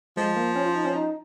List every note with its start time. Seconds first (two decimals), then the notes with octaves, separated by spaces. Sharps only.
0.17 F3 G#3
0.36 A#3
0.56 C#4
0.66 F4
0.76 D#4
0.85 C#4
0.95 D#4